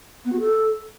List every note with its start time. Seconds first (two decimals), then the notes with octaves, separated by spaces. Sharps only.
0.24 B3
0.32 F#4
0.40 A4